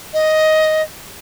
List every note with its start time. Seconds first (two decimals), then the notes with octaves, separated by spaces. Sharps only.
0.14 D#5